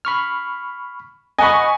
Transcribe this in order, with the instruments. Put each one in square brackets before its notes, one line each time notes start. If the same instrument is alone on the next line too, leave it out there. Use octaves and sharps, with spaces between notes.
[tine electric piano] B5 C#6 F6
[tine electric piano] D#5 F#5 B5 [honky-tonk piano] G#5 C#6